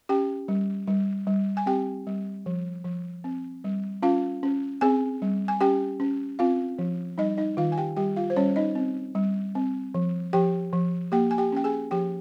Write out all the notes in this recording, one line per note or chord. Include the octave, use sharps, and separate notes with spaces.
C#4 G4 G5
G3
G3
G3
G#5
C4 G4 G5
G3
F3
F3
C4
G3
C#4 F4 F5
C#4
C4 G#4 G#5
G3
G#5
C#4 G4 G5
C#4
C4 F4 F5
F3
G3 D#4 D#5
D#4 D#5
D#3 F4 F5
G#5
G4 G5
G3 G4 G5
F4 F5
C5
G3 C#4 C#5
D#4 D#5
C4
G3
C4
F3
F3 G4 G5
F3
A#3 G4 G5
G#5
G4 G5
C#4 G5
G#4 G#5
F3 G4 G5